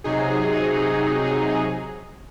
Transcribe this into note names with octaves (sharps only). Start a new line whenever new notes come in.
C3 F#3 D#4 G#4